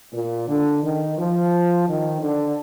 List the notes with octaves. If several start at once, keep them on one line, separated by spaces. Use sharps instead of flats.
A#2
D3
D#3
F3
D#3
D3